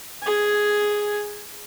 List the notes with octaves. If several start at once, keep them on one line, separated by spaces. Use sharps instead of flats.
G#4 G#5